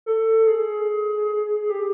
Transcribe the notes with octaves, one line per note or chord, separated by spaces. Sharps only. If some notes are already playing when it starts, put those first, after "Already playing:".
A4
G#4
G4